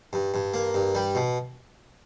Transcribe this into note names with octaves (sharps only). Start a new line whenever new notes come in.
G2
G2
A#3
G2
G3
B2